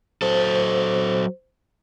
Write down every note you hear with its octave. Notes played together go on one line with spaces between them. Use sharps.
F#3 A4 C5